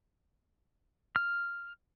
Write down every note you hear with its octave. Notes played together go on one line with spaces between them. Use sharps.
F6